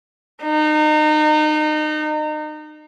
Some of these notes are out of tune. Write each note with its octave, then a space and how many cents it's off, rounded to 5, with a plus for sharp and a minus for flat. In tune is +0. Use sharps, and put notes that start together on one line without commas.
D#4 -30